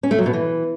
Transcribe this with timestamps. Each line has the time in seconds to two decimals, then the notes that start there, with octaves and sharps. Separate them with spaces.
0.03 C#4
0.11 A3
0.18 F#3
0.26 B2
0.33 E3